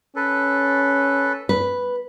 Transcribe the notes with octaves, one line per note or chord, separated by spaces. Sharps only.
C#4 A4 B4
B4